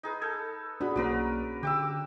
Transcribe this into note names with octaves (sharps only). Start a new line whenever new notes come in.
D#4 G#4 B4
A4 A5 G6 G#6
B3 D4 F#4 G#4 B5
B1 A#3 C#4 F#4 A#4 B4 D5
D3 G4 D6 E6